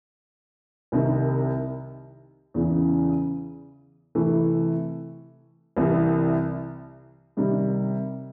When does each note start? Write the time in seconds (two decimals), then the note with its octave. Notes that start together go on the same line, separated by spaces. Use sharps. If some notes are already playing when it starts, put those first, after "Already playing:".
0.92 C2 C3 D#3
2.54 E2 C#3 E3
4.15 C3 E3 A3
5.77 C2 C3 E3
7.37 C3 D#3 G3